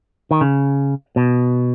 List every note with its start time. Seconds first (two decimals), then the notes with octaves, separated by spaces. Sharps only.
0.31 D#3
0.41 C#3
1.16 B2